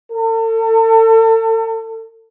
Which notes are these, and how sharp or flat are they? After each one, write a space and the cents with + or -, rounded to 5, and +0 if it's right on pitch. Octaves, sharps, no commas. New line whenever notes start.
A4 +40